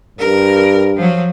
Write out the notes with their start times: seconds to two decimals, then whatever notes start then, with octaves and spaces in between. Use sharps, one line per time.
0.19 G2 A#4
0.96 F3 F#3